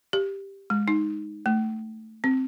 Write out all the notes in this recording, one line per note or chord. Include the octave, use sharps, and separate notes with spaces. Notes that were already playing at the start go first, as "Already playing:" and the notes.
G4
G#3
D#4
A3
C4